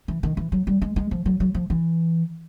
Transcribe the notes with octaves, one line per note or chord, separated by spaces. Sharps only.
E3
D#3
E3
F#3
G3
G#3
G#3
F3
F#3
F#3
F3
E3